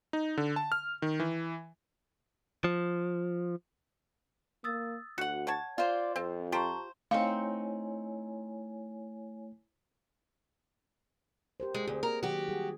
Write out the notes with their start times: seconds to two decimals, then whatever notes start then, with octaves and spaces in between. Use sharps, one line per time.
0.13 D#4
0.37 D3
0.56 A5
0.72 F6
1.02 D#3
1.20 E3
2.64 F3
4.64 A#3 D#6 E6 A6
5.18 D2 F#4 F#5 C#7
5.47 C#5 F#5 A5 G#6
5.78 F4 C5 D5
6.16 F2 C4
6.52 F4 G4 C5 A5 A#5 C#6
7.11 A3 C4 D#4 E4 C#5 F5 G#5 C#6
11.60 G4 A#4 C5
11.74 G#2 G#3
11.88 D2 C4 G#4
12.03 A#3 A#4
12.23 D#3 F#3 F#4 G4
12.49 G3 G#4